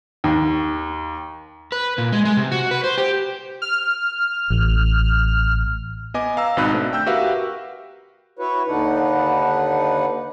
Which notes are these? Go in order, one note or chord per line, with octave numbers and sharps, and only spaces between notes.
D#2
B4
A#2
G#3
G#3
C3
F#4
B4
C5
G4
F6
A1
B3 D#5 G#5 D6
F5 A#5 E6
G#1 B2 C4 D#4 B5 F#6
A3 D4
G5 E6 G6
F#4 G4 A#4 B4 E5 F5
E4 F#4 B4 C#5
D#2 D3 D4 D#4 B4 F#5